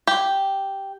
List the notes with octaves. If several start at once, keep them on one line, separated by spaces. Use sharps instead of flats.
G4